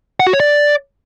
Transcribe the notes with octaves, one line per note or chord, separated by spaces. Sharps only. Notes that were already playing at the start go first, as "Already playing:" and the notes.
F#5
F#4
C#5
D5